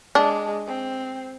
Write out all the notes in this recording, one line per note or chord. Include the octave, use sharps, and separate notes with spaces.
G#3 D4
C4